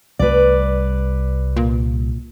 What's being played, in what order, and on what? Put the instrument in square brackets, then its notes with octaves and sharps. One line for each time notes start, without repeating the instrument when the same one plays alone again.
[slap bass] C2 G3 A3 [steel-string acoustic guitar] B4 D5
[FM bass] A#2